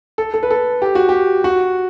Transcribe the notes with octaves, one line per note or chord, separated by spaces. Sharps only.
A4
A4
B4
A4
G4
F#4
G4
F#4